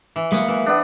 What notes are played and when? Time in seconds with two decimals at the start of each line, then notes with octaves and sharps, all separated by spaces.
0.16 E3
0.32 G#3 A#3 B3 F#4
0.48 E3
0.66 B3 D4